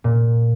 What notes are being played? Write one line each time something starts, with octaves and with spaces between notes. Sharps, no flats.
A#2